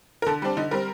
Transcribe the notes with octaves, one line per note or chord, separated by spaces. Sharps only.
A#4
D3 A4
G3 C4 D4
D3 D#4
G3 C4 A#4